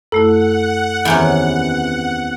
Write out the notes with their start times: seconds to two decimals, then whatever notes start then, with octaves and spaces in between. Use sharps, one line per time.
0.12 F#2 A3 E4 A4 F#5
1.05 E2 C3 D#3 C#4 G#5 A#5